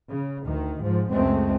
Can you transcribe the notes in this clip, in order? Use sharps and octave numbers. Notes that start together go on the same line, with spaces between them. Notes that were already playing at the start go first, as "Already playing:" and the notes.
C#3
D2 D#3
G#2 F3
C#2 F#2 G#3 A3 C4